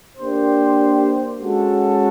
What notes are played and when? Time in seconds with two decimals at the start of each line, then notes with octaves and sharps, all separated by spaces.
0.17 A#3 D4 G4 C5
1.39 G#3 C#4 F#4 A4